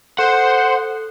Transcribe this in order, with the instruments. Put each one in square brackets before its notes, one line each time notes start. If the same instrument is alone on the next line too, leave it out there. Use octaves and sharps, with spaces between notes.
[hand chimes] A4 F#6 [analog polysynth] C5 [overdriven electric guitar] F#5